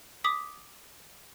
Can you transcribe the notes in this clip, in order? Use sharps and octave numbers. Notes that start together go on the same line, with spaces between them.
D6 D#6 B6